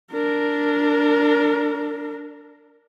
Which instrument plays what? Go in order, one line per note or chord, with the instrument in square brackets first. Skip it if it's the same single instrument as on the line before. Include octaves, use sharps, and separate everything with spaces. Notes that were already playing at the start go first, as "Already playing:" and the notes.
[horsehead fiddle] D4 A#4